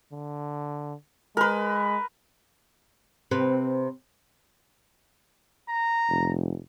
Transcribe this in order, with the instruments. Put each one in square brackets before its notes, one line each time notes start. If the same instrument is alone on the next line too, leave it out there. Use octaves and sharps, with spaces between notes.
[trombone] D3
[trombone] G#3 [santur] A#4 B4
[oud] C3 B4 [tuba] C4
[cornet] A#5
[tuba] F1